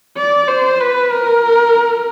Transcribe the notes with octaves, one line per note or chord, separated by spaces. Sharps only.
D5
C5
B4
A#4